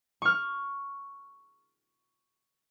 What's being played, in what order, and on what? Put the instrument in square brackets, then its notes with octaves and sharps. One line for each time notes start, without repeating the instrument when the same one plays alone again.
[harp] C#6 F6